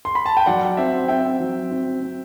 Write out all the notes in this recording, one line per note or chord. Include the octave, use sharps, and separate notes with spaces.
C6
B5
A5
G5
F#3 D5 F#5
C4 C5 E5
C4 E5 G5
F#3
C4
C4